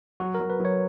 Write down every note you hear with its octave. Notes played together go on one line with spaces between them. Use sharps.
F#3 F#4
A#4
F#3
B4
F#3
C#5